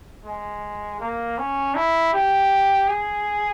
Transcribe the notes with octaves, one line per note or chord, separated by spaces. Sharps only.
G#3
A#3
C#4
E4
G4
G#4